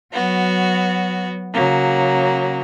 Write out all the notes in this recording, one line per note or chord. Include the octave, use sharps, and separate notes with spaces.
F#3 B3 F#4
C#3 F#3 A#3